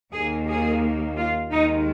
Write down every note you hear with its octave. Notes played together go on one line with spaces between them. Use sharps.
D#2 D#3 A#3 G#4
G#4
F4
D#2 D#3 G#3 D#4